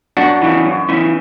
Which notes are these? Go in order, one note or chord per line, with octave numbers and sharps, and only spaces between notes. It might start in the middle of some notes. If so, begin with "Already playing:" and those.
F#2 D4 F#4
C#3 E3
F#2
C#3 E3